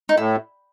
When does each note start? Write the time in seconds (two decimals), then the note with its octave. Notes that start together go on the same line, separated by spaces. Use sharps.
0.09 D#4
0.17 A2 E4